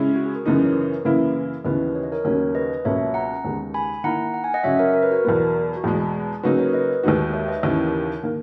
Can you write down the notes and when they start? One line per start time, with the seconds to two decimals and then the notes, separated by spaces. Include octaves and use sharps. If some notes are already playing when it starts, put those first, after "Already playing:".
Already playing: C#3 G#3 C#4 E4
0.16 F#4
0.25 G#4
0.35 F#4 A#4
0.46 F#2 C#3 E3 B3 D#4
0.56 G#4 B4
0.65 A#4 C#5
0.75 G#4 B4
1.05 F#2 C#3 E3 A#3 E4 G#4 B4
1.65 D#2 C#3 E3 B3 B4 D#5
1.95 C#5
2.03 D#5
2.12 A#4 C#5
2.25 D#2 C#3 F#3 A#3 C#4 A#4 C#5
2.55 B4 D#5
2.84 C#2 B2 F#3 A#3 C#5 E5
3.14 F#5 A#5
3.44 D#2 C#3 G#3 B3
3.74 G#5 B5
4.04 D#3 A#3 E4 F#5 A#5
4.34 F#5
4.44 G#5
4.54 D#5 F#5
4.64 F#2 C#3 F#3 C#5 E5
4.79 A#4 C#5
4.94 A#4
5.03 B4
5.11 F#4 A#4
5.24 E2 B2 F#3 B3
5.77 F#4
5.84 E2 B2 G#3 G#4
6.14 G#4
6.43 C#3 F#3 A#3 D#4 F#4 G#4 B4
6.59 A#4 C#5
6.73 B4 D#5
7.03 D#2 D#3 G#3 D#4 F#4
7.34 C#5 E5
7.48 B4 D#5
7.63 D#2 C#3 E3 A#4 C#5
8.23 D#3 A#3